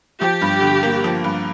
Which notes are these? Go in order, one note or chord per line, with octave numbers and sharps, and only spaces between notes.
F3 G4
G2
D3
A#3
F3
G2